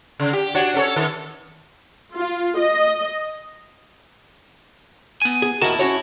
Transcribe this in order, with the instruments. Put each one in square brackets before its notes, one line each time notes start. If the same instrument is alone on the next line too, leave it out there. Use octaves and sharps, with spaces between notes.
[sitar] C#3
G4
D4 F#4 C#5
C#4 A4 C#5
D#3 A4
[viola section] F4
D#5
[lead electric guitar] B3 G#5
[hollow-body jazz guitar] G#4
[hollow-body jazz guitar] D#2 F#4 A#4 [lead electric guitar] E4 A5
[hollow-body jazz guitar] C#4 F#4 C#5